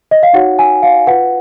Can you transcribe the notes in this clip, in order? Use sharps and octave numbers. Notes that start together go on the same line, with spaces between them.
D#5
F5
D#4 F#4 C#5 F#5
G#5
F5
F4 B4 F#5